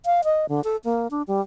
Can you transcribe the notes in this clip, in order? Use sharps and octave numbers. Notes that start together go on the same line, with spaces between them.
F5
D#5
D3
A4
A#3
D4
G3